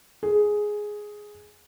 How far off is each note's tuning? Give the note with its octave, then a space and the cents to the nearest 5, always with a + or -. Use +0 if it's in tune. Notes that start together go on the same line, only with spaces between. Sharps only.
G#4 +5